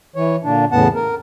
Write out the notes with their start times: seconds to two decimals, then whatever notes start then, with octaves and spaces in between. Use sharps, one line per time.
0.16 E3 C#5
0.44 A#2 D3 D4
0.72 E2 A2 C#3 B3 F#5 A5
0.95 A#4